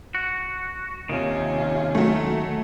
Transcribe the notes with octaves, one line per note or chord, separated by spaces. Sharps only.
F#4
D#2 C3 D#3 C#4 F4
F#3 A3